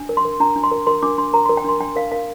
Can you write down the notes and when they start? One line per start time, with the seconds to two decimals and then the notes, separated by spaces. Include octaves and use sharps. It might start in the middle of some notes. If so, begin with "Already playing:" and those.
Already playing: D4
0.09 A#4
0.17 C6
0.25 A#4
0.40 D4 A#5
0.56 D4
0.64 C6
0.71 A#4
0.87 A#4 C6
1.03 D4 D6
1.18 D4 C6
1.34 A#4 A#5
1.46 C6
1.49 A#4
1.57 G5
1.64 D4 C6
1.80 D4 G5
1.96 A#4 F5
2.12 A#4 F5